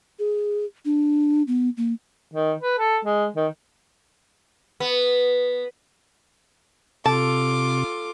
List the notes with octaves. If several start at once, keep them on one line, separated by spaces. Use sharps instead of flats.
G#4
D4
B3
A#3
D#3
B4
A4
G#3
D#3
B3
C3 F4 A4 A5 D6